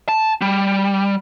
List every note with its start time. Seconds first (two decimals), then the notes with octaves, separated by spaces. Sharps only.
0.09 A5
0.42 G3